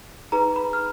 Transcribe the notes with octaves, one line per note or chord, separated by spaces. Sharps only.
D#4 G#4 B4 A#5
B5
F6